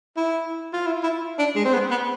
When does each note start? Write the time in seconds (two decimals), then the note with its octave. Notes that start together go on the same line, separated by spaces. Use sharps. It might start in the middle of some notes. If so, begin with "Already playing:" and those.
0.17 E4
0.73 F4
0.87 E4
1.03 E4
1.38 D4
1.56 G#3
1.65 C4
1.73 B3
1.91 B3